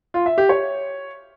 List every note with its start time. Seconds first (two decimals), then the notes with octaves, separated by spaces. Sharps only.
0.14 F4
0.26 E5
0.38 G4
0.49 C#5